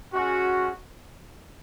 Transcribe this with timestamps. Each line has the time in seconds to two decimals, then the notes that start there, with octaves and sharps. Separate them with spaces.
0.14 G#3 C#4 F#4